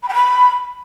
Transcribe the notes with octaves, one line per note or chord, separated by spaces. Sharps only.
B5
G5
B5